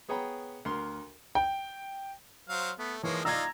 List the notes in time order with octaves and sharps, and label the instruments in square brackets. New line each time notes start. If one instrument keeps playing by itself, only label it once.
[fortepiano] B3 G#4 C#5 G5 A#5 B5
D2 A#4 C6
[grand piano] G5
[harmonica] F#3 C5 F5
[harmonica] A3 [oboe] B3
[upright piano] E3 [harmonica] F3 G#3 A#3 [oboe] C#5
[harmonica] D#4 F4 D5 [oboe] A#5 [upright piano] E6 G#6